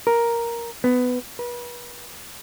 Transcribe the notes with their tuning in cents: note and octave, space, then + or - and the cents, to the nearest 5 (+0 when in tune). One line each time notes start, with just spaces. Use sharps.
A#4 +5
B3 +15
B4 -35